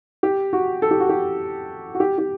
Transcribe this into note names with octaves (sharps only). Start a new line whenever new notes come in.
G4
F#4
A4
G4
F#4
G4
F#4
G4
G4